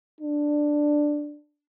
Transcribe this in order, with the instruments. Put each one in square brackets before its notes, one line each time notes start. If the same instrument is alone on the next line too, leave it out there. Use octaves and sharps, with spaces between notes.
[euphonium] D4